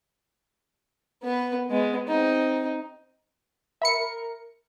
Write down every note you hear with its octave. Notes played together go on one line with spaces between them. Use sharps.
B3 B4
G#3 B3
C4 D#4
A#4 E5 B5 C#7